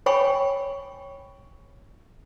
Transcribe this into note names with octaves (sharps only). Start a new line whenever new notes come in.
C#5 G5 G#5 B5 C#6